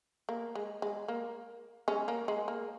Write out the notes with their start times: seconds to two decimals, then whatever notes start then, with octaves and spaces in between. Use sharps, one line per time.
0.29 A#3
0.55 G#3
0.82 G#3
1.08 A#3
1.88 G#3 C#4
2.08 A#3
2.28 G#3
2.48 A#3